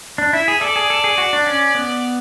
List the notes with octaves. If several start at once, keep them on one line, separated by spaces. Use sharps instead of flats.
D4
E4 E5
G#4
A4 D5
G#4
A4
G#4
F#4
D4
C#4
B3